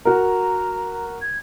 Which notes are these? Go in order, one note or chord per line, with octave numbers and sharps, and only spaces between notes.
F#4 A#4 A#5
G#6